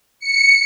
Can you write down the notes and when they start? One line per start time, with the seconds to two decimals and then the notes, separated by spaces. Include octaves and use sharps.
0.20 C#7